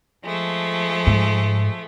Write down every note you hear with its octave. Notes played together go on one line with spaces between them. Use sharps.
F3 G#3 A3
G#2